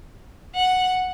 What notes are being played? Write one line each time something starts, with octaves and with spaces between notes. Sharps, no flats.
F#5